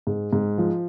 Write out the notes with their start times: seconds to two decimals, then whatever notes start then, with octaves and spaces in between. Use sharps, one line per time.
0.07 G#2
0.33 G#2
0.58 F3